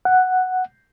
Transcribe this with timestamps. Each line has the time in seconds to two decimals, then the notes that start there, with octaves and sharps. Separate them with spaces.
0.05 F#5